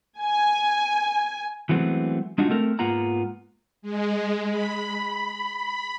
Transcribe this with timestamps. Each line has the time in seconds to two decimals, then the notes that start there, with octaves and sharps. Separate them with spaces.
0.20 G#5
1.69 E3 F#3 G#3 A3 B3 C4
2.38 G#3 D4 D#4 F4 F#4
2.49 A3 C4 A4 A#4
2.79 G#2 A#3 B3 F4 F#5 A#5
3.82 G#3
4.50 B5